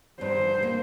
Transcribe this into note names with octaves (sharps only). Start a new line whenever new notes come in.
G2 C5
A#3